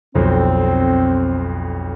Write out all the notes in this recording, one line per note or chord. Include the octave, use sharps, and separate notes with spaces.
B1 F2 C4